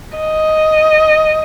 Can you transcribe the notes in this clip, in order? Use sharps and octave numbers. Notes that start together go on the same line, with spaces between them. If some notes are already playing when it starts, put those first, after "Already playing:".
D#5